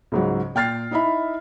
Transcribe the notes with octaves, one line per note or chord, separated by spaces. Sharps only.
C#2 G#2 F#3
A#2 G5 F6 A6 C7
D#4 E4 D#5 E5 B5